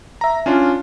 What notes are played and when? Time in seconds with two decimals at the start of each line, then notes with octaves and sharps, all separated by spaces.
0.21 E5 A#5
0.46 C#4 D4 F4